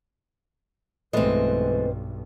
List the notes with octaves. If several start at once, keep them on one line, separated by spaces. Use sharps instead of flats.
B1 G2 E3 G#3 A3 C4 B4 D#5